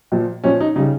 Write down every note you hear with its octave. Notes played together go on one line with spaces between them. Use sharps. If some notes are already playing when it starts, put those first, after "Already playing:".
A#2 F3
A#2 F3 C#4
D#4
C#3 G3 D#4